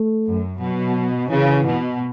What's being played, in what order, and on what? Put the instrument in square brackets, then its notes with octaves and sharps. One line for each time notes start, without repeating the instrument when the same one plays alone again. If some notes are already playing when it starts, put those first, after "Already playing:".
Already playing: [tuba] A3
[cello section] F#2
[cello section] B2 [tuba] F#3
[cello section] C#3 [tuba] E3
[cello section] B2